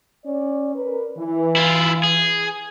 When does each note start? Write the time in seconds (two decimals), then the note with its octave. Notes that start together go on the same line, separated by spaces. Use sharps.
0.25 C#4 D5
0.75 A#4 B4
1.18 E3
1.56 E4 F4
2.04 G#4